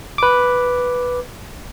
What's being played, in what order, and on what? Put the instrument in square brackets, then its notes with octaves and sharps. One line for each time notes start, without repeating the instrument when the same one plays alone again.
[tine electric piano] B4 D6